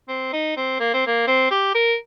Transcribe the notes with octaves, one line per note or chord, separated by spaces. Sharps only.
C4
D#4
C4
A#3
C4
A#3
C4
G4
A#4